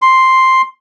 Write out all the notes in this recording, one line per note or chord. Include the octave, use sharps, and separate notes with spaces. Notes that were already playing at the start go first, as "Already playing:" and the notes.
C6